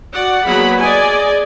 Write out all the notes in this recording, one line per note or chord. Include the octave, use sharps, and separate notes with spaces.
F#4 D5 F#5
F#3 A#3 B3 G#4 F#5 B5
G#4 D5 D#5 G#5